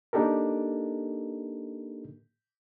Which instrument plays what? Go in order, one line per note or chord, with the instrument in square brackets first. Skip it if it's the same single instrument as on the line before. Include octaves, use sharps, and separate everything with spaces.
[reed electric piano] A#3 D4 D#4 G4 A4 A#4